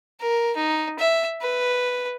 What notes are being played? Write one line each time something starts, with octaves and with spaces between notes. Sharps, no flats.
A#4
D#4
E5
B4